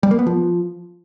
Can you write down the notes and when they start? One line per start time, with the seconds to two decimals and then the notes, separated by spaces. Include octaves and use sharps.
0.03 G3
0.11 A#3
0.19 B3
0.27 F3